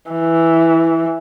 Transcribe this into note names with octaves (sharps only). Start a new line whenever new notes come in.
E3